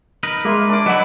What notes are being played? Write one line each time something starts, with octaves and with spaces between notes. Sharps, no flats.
D#4 A#4 B4
G#3 A#3 E5 C6
D4 D6
F#3 E4 B4 D#5 F#5